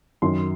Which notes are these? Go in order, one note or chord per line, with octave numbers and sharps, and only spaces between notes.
F#2 D#3 F#3 C6